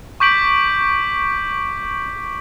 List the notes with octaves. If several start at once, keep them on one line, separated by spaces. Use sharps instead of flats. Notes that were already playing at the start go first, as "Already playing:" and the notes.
C#6 D6 G6 B6 D7 F#7